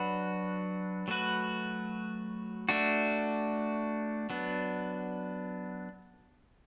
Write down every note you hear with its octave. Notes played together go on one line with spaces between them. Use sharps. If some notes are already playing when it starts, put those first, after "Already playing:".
Already playing: F#3 D4 F#4 B4
F#3 A3 F#4 B4
A3 D4 F#4
F#3 B3 D4